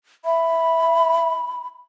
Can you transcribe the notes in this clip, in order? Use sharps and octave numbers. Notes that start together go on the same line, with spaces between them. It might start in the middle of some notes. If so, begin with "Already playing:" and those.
E5 B5